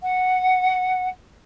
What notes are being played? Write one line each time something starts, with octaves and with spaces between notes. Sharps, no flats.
F#5